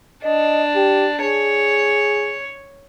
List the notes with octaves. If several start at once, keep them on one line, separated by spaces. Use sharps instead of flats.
D4 D#5
G4
G#4 C#5